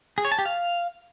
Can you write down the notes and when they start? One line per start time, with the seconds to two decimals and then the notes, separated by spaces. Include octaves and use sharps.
0.18 G#4
0.25 C#5
0.32 A5
0.39 G4
0.45 F5